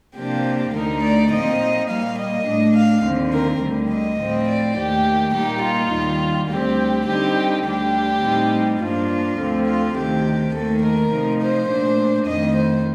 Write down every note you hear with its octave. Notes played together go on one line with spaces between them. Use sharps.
C3 F3 A#3 D4 G4
D2 D3 A3 D#4 A#4
D5
A#2 F3 C4 D#4 D#5
A#2 G3 A#3 F5
D#5
A2 A3 D4
F5
D#2 D3 F3 C4
A#4
D2 D3 G3
D#5
A2 F3 C4
D5
D#2 D#3 A3 G4
A#2 G3 A#3 D#4 G4
F4
D#2 D#3 G3
D2 D3 G3 C4 G4
D3 G3 C4 D#4 G4
D2 D3 G3 D4 G4
A2 G3 C4 D#4
G2 F3 A#3 D4 F4
D2 D3 F3 C4
F4
D2 C3 D#3 G4
D#2 D#3 A3 A4
A#4
C3 F3 A3 D#4
C5
A#2 A3 D4
F2 D#3 A3 D#5
C5